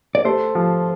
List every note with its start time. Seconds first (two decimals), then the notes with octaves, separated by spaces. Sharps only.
0.15 D5
0.25 A3 C5
0.55 F3